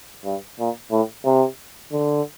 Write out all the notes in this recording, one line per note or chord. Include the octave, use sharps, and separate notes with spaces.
G2
A#2
A2
C3
D3